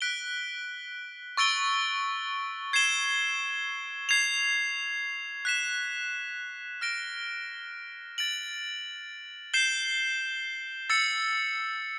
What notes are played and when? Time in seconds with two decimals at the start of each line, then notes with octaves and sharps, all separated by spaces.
0.01 F#6 B6 D7 G7
1.37 C#6 E6 A6 D7 G7
2.73 G#6 C7 E7 G7
4.09 G#6 C7 F7
5.45 F#6 B6 E7
6.81 F6 A#6 D7 G7
8.18 A6 D7 F#7
9.54 G6 C7 E7 G7
10.90 E6 A6 C#7